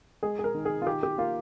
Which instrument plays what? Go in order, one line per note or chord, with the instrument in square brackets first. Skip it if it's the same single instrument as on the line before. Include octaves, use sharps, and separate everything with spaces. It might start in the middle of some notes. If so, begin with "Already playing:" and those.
[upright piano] G#3 G#4
G#4
A#4
D#3
G#4
F4
D#3 G4
G4
A#3 F4